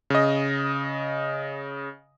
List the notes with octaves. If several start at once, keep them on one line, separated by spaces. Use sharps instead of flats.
C#3 D#5